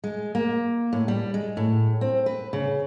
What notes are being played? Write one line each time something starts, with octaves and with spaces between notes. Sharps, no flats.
G#3
A#3
A2
G3
G#3
A2
C4
B4
C#3